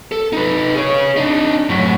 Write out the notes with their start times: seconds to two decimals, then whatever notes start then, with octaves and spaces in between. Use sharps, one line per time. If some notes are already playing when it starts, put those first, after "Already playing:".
0.12 A4
0.33 D#4 B4
0.75 G#4 C#5
1.17 D4 D#4
1.69 F#2 A2